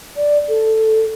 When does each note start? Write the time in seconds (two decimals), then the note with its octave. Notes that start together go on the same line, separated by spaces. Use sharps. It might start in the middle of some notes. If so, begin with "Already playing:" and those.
0.16 D5
0.49 A4